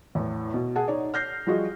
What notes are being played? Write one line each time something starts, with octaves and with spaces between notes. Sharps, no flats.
E2 A2
B2
G#4 F#5 A5
D#4 C#5 D5
F6 G6 A#6 C7
F3 G3 F4 F#4 G#4 D#5